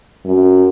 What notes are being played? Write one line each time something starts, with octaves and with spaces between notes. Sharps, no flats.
F#2